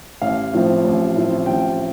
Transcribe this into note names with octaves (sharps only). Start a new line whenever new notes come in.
A1 F5
A2 F3 C4
A1
A2 F3 C4
A1 G5